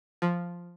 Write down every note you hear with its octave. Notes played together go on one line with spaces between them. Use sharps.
F3